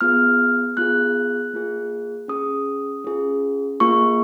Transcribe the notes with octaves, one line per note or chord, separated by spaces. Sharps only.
B3 F4 G#4 F6
B3 F4 G#4 F#6
A#3 F4 G#4
C#4 G#4 D#6
C#4 F4 G#4
A#3 F4 G#4 C#6